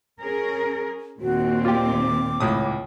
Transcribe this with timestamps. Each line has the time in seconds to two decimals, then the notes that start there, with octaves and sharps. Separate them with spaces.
0.21 C#4 G#4 A#4
1.21 D#2 A#2 C4 F#4
1.65 F4 G4 D6
2.40 C#2 A2 D#6